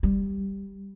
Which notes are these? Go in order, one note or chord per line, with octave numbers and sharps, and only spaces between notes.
G3